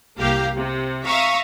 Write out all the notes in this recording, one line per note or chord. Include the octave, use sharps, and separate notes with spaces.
C2 A#3 G4 F5 A#5
C3
E5 F5 A#5 C#6 D#6